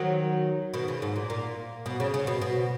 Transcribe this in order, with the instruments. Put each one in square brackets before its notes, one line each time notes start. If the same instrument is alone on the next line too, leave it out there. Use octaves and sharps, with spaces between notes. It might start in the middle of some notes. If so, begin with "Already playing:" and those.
Already playing: [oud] D#3 F#3
B2 D#3
C#3
G#2
A#2
A#2
B2
C#3
C#3
B2
B2